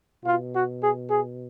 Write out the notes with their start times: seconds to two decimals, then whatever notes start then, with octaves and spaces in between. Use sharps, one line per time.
0.24 B2 F4
0.52 F#4
0.81 G#4
1.09 G#4